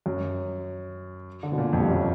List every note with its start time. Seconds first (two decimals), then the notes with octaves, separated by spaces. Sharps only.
0.06 F#2
1.43 D3
1.52 B2
1.58 A#2
1.73 F2
1.80 G2
1.88 F#2